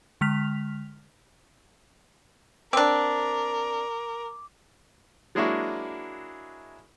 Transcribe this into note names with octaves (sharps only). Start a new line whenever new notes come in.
D3 G#3 F6 B6 F7
C4 D4 A#4 D6
F#3 G#3 A#3 D4 E4 F#4